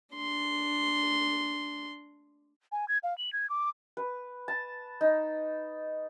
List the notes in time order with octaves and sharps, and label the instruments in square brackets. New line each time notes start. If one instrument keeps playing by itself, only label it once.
[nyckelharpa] D4 C6
[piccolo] G#5
G#6
F5
F#7
G#6
D6
[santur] B4
A5
D#4